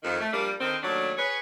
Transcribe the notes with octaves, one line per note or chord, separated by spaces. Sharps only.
F2 D#3
A3
F3 G3 A#3 D4
D3 D#3 C4
D#2 F#3 A3 D4
G#4 B4 C#5